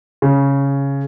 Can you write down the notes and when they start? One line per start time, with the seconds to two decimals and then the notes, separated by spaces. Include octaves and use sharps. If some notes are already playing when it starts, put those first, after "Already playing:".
0.22 C#3